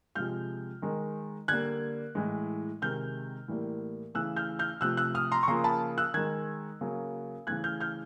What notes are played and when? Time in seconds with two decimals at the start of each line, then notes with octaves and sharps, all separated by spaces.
0.15 C3 F3 G#3 F6 G6
0.82 D#3 G#3
1.48 D3 G3 A#3 F#6 G#6
2.15 A2 E3 G#3
2.82 C3 D#3 G#3 F6 G6
3.48 A2 E3 G3 A#3
4.14 C#3 E3 A3 E6 F#6
4.36 F6 G6
4.59 F6 G6
4.81 C3 F3 A3 E6 F#6
4.97 E6 F#6
5.15 D#6 F6
5.32 A#5 C6
5.43 C#6
5.48 C#3 F3 A#3 A#5 C6
5.64 A5 B5
5.98 E6 F#6
6.14 D#3 G#3 F#6 G#6
6.81 C#3 F#3 A#3
7.47 C#3 E3 A3 F#6 G#6
7.64 F6 G6
7.81 F6 G6